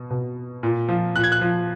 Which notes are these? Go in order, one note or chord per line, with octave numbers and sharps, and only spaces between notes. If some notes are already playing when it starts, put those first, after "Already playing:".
Already playing: B2
B2
A#2
F3
A#2 F#6
G#6
F#6
F3